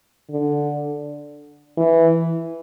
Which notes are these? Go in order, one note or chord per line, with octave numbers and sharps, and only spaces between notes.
D3
E3